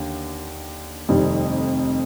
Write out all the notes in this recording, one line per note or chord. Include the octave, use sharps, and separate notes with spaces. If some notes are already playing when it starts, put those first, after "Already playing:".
Already playing: D#2 D3
F1 F2 D#3 G3